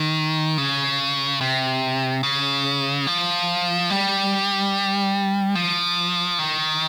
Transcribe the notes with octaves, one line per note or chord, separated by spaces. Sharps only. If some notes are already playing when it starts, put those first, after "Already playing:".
Already playing: D#3
C#3
C3
C#3
F3
G3
F3
D#3